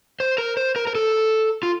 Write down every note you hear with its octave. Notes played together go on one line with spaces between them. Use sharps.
C5
A#4
C5
A#4
A#4
A4
F4